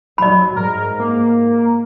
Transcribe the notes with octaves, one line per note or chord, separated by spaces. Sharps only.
F#3 D5 B5
G#2 A#4
A#3